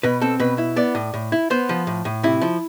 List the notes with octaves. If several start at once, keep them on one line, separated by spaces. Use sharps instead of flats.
B2 B4
C4 A4
B2 B4
E4
B3 D5
A2
A2
E4
B3 C5
F3
A2
A2
C3 E4
F3